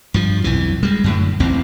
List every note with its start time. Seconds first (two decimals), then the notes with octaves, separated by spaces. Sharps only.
0.14 G2 F3
0.44 B1 F2 E3
0.83 G3 G#3
1.04 F#2 A2 D3
1.40 A1 E2 C4